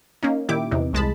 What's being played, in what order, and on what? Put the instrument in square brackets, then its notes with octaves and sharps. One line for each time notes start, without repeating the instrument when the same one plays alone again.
[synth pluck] A#3 C#4 D#4
A#2 D#3 E4 G4 D6
E2 C3 E3 D#4
C2 G#3 A5 B5